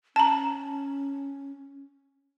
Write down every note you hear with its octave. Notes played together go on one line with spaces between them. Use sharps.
C#4 A5 A#5